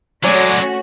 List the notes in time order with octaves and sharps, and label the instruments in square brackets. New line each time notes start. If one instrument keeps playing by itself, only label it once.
[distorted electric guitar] F#3 G#3 [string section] A3 C#4 F#4 [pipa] C#5 [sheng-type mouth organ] D5 G#5